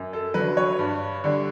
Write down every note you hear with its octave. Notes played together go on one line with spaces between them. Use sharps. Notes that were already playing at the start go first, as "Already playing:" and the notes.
Already playing: F#2
A4
D3 F#3 B4
C#5
G2
D3 G3